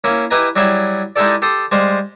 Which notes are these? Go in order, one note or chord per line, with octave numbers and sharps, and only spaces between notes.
A#3 C#4 E4
E4 G4 B4 D#5 G#5 A#5
F#3 G3 E4 G#4 E5
G#3 D#4 E4 G4 A4 D5
G4 A4 C6 D#6
G3 G#3 C5 F5